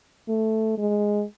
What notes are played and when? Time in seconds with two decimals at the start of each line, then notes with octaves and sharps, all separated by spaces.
0.29 A3
0.78 G#3